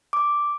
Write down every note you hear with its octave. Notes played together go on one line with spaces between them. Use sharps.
D6